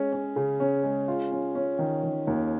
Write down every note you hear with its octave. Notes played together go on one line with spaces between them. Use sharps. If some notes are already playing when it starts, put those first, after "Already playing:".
Already playing: G#3 C#4
C#4
C#3
C#4
G#3
F4
C#4
C#4
D#3
D#3
D#2